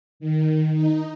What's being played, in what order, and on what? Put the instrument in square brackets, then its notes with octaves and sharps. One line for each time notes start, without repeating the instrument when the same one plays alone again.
[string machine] D#3
D#4